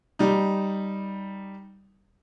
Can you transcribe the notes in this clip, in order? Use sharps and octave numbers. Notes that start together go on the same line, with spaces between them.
G3 D#4